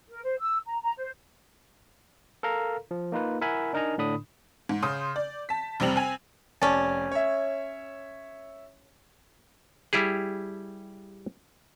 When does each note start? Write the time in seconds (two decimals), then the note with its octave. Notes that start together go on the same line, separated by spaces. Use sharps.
0.08 A#4
0.23 C5
0.39 E6
0.66 A#5
0.83 A#5
0.97 C5
2.43 A4 A#4 F5 A#5
2.91 F3
3.12 A#3 D#4 F4 B4
3.41 E4 A#4 E5 F#5 G#5 B5
3.73 D4 D#4 A#4 D#5 G#5 A#5
3.98 A2 D3 D4 B5 D#6
4.69 G#2
4.82 C#3 C6 D#6 G6
5.16 D5
5.49 A5 B6
5.80 F1 C3 G3 C4 F7 F#7
5.96 C4 G#5
6.62 F1 C#4 D5 A5
7.12 C#5 E5
9.93 G3 E4 G4 G#4